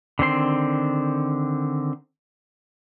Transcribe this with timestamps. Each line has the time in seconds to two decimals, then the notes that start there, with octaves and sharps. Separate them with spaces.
0.19 D3 D#3 C4 C6